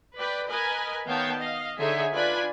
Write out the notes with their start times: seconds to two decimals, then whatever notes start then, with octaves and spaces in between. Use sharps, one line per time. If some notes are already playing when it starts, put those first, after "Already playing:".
0.15 B4 D5 G5
0.48 A#4 B4 D#5 G#5
1.07 D#3 B3 C#5 F5 G5 A5
1.36 D#5 F5
1.79 D3 D#4 G#4 C#5 E5 G#5
2.12 D4 F4 B4 D5 G#5 B5